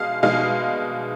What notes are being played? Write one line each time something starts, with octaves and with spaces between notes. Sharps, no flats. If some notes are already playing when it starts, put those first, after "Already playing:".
Already playing: B2 G#3 D#4 F5
B2 G#3 D#4 F5